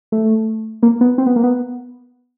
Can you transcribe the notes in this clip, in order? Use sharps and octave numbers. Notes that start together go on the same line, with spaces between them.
A3
A#3
B3
C4
B3
A#3
B3